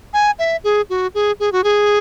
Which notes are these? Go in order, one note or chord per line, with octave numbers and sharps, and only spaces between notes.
G#5
E5
G#4
F#4
G#4
G#4
F#4
G#4